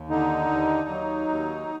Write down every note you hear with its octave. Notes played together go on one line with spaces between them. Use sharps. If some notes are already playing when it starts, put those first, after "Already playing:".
Already playing: D#2
D3 D#4
D#2
F#3
D#2